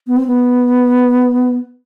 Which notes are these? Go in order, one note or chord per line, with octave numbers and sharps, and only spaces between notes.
B3
C4
B3